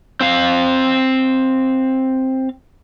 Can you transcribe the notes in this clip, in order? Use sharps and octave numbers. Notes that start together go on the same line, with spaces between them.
C4 F5